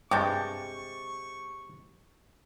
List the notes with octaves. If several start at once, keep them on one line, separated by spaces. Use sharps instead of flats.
G2 C3 G#3 C#6 D6 G6 A6